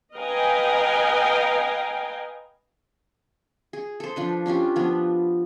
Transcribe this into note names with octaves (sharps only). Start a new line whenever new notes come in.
B4 D#5 F5 G5 G#5 A#5
G#4
A4 C5
F3 D4 B4
C#4 D4 F4 G4
F3 B3 D4